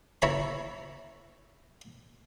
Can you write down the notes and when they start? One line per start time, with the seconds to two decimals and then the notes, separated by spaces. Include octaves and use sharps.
0.22 E4 C#5 A#5 B5